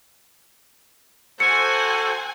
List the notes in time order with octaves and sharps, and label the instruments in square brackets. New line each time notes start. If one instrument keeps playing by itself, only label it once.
[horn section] F#4 A4 C5 [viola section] F#5 G#5 [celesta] C#7